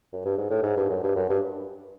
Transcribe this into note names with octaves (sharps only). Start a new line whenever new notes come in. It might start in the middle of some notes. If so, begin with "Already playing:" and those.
F#2
G2
G#2
A2
G#2
G2
F#2
G2
F#2
G2